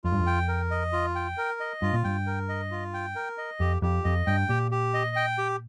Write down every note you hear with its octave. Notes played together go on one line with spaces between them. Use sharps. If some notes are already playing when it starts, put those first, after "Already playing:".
F2 F4
G2
F2
G5
A#4
D#5
F4
G5
A#4
D#5
G2 F4
A#2
G2 G5
A#4
D#5
F4
G5
A#4
D#5
F2 G4
F2 G4
F2 D#5
G2 G5
A#2 G4
G4
D#5
G5
G4